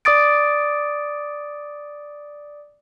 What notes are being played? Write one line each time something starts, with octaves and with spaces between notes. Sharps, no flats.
D5 D6 D#6 A6 D7